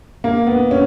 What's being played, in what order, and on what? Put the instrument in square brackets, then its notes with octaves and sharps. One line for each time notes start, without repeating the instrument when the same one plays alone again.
[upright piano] A#3
B3
C#4